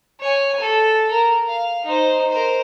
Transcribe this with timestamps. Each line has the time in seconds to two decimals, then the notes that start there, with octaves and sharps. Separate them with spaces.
0.20 C#5 G#5
0.60 A4
1.11 A#4
1.48 F5
1.85 D#4 C5
2.30 A#4 C5